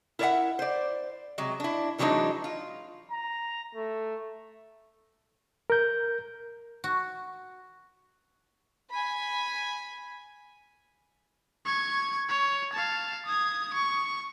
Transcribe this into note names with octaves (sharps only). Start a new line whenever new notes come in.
E4 A#4 C#5 D5 E5 F#5
C5 D5
C3 F#3 G#3
D4 E4
C3 E3 F#3 G#3 D4 D#4
F4
A#5
A3
A#4 G6
F#4
G#5 B5
C#6 G#6
C#5
F5 A5
D#6 G#6
C#6